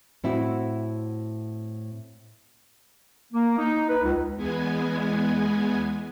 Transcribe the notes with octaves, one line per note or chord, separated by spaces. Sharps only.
A2 C4 E4 F#4
A#3
D#4
B4
C#2
E2 G#3 B3 G#5